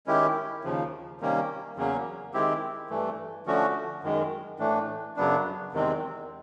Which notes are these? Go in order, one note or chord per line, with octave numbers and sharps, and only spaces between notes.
D#3 G#3 C#4 E4 G4
D#2 C#3 F3
C3 D#3 G3 A#3 C#4
E2 C#3 F#3 A#3 C#4
D#3 G#3 C4 E4 G4
G2 E3 A3
D3 F3 A3 C#4 F#4
F#2 D#3 G#3
A2 E3 A3 D4
F#2 C#3 F#3 B3 D4
E2 C3 D#3 G#3 C4